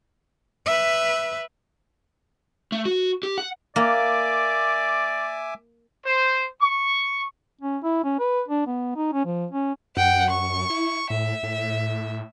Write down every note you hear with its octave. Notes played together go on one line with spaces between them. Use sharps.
B4 E5
A3
F#4
G4
F#5
A#3 D5 E5 G#5 D6
C5
C#6
C#4
E4
C#4
B4
D4
B3
D#4
C#4
F3
C#4
F#2 F#5 G5
C#6
E4
A2 E5
A2